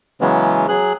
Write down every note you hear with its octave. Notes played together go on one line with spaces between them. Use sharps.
C#3 E3 F#3 G#3 B3 C#4
F#3 G#4 F#6